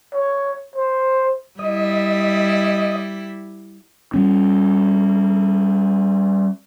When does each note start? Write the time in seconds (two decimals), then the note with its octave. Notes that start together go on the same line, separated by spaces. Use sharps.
0.14 C#5
0.75 C5
1.59 G3 E4 D#5
4.14 G3 C#4